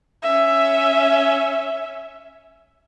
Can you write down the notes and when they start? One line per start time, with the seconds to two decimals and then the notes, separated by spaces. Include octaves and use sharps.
0.22 C#4 E5